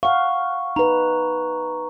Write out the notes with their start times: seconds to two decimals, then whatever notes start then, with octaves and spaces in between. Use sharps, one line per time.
0.03 F5 F#5 C#6
0.76 D#4 B4 A#5